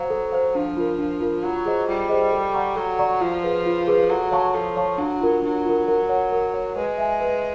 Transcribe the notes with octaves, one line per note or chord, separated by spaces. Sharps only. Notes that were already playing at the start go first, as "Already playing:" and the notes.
Already playing: F#3 C5 F5
A4
C5 F5
F3 D4
F4 A#4
D4
F4 A#4
F#3 F4
G#4 C5 D#5
G3 F4
G#4 C5 D#5
A4
D5 F#5 A#5 C#6
F#3 A4
D5 F#5 A#5 C#6
F3 F4
G#4 B4
F4
G#4 B4
F#3 A4
C#5 F5 A5 C#6
F3 A4
C#5 F5 A5 C#6
F#3 D4
F4 A#4
F#3 D4
F4 A#4
A#4
C#5 F#5
A#4
C#5 F#5
G#3 B4
E5 G#5
B4